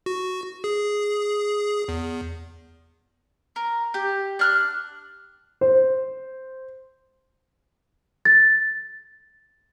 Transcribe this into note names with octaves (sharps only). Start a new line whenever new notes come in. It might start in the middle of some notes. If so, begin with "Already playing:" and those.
F#4
G#4
E2
A#4
G4
D4 F6 F#6
C5
A6